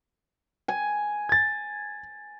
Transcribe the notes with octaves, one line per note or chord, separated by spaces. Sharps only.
G#5
G#6 A6